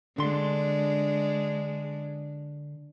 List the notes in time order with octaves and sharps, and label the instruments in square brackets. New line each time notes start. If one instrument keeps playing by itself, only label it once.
[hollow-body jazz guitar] D3 C6 [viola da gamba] G#3 D4